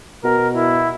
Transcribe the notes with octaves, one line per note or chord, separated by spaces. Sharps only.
B2 A#4
E4